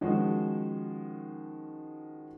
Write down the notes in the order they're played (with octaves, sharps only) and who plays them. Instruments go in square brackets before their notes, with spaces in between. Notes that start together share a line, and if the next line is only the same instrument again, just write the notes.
[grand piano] D#3 F3 G#3 C#4 F#4